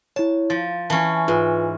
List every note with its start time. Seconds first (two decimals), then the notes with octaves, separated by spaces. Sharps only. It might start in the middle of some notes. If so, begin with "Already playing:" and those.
0.16 E4 C#5 A5
0.50 F3 A6
0.90 E3 C#4 A5
1.28 G#2 F4 B4